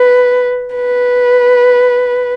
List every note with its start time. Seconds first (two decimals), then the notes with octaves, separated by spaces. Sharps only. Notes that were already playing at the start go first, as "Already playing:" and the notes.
Already playing: B4
0.76 B4